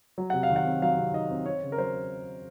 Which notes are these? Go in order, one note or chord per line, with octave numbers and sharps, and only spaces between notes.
F#3
C3 F#5
F5
D#3
F#5
C4
F#3 F5
C3
D#3 D#5
C4
C4 C#5
C#3
A#4
F#3 C5